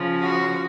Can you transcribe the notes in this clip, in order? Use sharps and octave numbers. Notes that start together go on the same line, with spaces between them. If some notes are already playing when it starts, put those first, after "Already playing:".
Already playing: C#3 F3
F#4